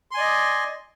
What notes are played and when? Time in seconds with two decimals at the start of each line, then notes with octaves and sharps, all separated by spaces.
0.11 C6
0.14 G#5
0.17 D5
0.20 D#5